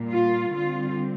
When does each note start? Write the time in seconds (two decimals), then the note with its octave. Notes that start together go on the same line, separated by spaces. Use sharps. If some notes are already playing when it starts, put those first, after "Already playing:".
Already playing: A#2 G3 A#3
0.11 F4
0.54 D3 G3 C4 F4